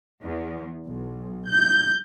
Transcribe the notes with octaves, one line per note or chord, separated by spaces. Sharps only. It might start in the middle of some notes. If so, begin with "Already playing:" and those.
E2
B1
G6